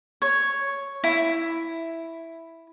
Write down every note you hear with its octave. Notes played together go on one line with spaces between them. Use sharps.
C#5
E4